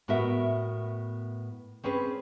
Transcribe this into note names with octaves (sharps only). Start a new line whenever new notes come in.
A2 B3 F#4 A#4 E5
C4 C#4 G#4 B4